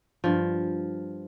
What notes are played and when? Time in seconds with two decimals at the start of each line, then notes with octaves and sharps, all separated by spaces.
0.24 G2 F3